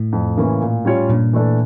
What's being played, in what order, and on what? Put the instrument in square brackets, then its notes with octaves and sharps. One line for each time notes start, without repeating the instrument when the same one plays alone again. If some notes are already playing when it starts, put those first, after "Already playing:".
Already playing: [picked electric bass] A2
[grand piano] F2
C#3 E3 A#3 C#4
A#2
G3 C#4 F4 C#5
[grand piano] G2 [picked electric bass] A#2
[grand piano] E3 A3 D4 A4